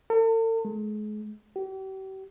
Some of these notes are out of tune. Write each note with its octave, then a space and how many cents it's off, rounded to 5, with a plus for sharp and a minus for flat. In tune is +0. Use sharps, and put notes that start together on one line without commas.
A4 +45
G#3 +35
G4 -40